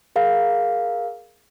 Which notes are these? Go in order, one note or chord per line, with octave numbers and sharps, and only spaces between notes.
G#4 A#4 F5